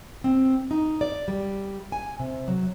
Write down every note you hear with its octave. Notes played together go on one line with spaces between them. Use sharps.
C4
D#4
D5
G3
G#5
C3
F#3